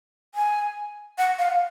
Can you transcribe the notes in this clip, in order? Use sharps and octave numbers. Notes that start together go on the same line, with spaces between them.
G#5
F#5
F5